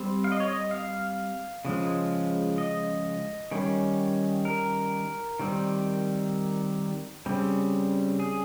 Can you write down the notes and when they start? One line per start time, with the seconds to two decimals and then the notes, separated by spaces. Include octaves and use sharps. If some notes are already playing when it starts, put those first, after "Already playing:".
Already playing: G3 C4
0.24 F5
0.32 D#5
0.40 C#5
0.48 D#5
0.71 F5
1.65 C#3 F3 G#3
2.58 D#5
3.51 D#3 G3 C#4
4.45 A#4
5.39 D#3 G3 C4
7.26 C#3 G3 C4
8.20 G#4